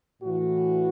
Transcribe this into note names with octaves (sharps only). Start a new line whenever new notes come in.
A2 E3 F#4